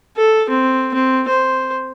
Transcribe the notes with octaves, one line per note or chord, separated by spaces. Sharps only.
A4
C4
C4
C5